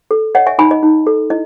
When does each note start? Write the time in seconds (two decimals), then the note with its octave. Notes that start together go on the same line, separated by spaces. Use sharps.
0.11 A4
0.35 C#5 D#5 F#5
0.47 E5 G#5
0.58 D#4 G#5 B5
0.71 D#5
0.83 D#4
1.07 A4
1.30 E4 D#5